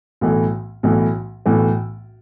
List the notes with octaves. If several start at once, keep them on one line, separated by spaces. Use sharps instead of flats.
B1 A2 E3 A3
B1 A2 E3 A3
B1 A2 E3 A3